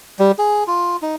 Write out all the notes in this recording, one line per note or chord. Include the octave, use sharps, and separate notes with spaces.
G3
G#4
F4
D#4